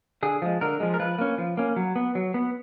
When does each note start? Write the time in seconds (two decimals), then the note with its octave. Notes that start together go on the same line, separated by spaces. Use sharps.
0.23 D3 G#4
0.42 F3 G#3
0.61 D3 A#4
0.80 F3 G#3
0.94 A#4
0.99 F3 B4
1.18 A#3 C#4
1.38 F3
1.57 A#3 C#4
1.76 F#3
1.96 B3
2.15 F#3
2.34 B3